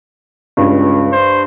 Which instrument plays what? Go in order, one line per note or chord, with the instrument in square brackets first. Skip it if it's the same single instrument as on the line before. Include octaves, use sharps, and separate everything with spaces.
[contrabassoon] C#2 [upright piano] G2
[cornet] C5